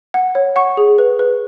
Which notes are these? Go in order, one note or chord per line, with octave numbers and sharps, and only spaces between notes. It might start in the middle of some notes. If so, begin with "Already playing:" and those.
F#5
C#5
F#5 C#6
G#4
B4
B4